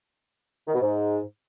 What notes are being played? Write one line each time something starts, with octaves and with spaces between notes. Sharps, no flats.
D#3
B2
G#2